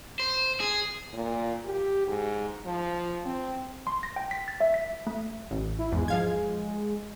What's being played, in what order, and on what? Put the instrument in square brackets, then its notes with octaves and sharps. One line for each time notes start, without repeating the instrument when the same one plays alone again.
[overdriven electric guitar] C5
G#4
[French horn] A#2
G4
G#2
F3
C4
[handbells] C6
A#6
G5
B6
A6
E5
B6
A3
[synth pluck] A1
[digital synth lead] E4
[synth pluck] E2 G#2 [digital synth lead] G#3
[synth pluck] F3 F5 G#6